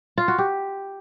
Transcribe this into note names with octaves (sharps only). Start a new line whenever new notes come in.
F4
F#4
G4